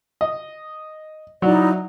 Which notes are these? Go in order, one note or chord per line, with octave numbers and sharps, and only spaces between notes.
D#5
F#3 D#4 E4 D5